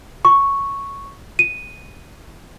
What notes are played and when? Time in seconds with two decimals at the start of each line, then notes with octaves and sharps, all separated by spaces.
0.25 C#6
1.39 D#7